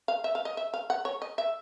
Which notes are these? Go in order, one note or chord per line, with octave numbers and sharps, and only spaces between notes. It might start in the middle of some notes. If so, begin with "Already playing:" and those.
F5
E5
F5
D#5
E5
F5
F#5
C#5
D#5
E5